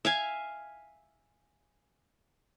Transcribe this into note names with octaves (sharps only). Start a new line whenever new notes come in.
E5 F5 G#5